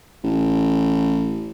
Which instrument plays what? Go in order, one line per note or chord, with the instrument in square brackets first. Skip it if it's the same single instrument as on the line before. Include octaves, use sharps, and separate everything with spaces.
[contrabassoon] A1